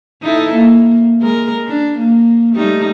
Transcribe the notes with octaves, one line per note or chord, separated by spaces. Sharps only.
D#4 E4 A4
A#3
G#3 A#4
D4
A#3
G3 A3 D#4